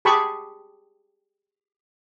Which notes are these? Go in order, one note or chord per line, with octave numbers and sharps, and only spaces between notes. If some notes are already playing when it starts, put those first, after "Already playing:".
G4 G#4 A5 B5 C#6